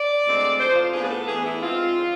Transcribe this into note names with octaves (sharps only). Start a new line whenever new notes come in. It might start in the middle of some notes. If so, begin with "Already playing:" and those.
Already playing: D5
D2 D3 G#3 C4
F2 C3 F3 C5
F4
A2 F3 B3 D4 G#4
B4
A4
A2 E3 B3 D4 G#4
E4
G#2 G#3 C4 F4
D3 F3